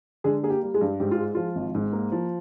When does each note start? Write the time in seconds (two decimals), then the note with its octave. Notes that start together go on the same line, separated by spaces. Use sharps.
0.24 D3 G#3 G#4
0.43 A#3 G#4
0.50 G4
0.62 G3
0.74 G#3 G#4
0.81 G2
1.00 G#2 G4
1.11 F4
1.18 G#3
1.35 F3 F4
1.56 G#1
1.75 G#2
1.93 A#3
2.12 F3